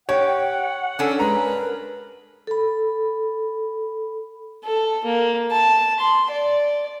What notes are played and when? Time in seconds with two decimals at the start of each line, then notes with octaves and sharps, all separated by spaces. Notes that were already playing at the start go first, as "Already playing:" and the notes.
0.09 G4 C#5 F#5 G5
0.99 C#4 D4 A4
1.20 G#3 B4 A#5
1.44 A#4
2.47 A4 B5
4.65 A4
5.05 A#3
5.52 A5
5.99 C6
6.30 D5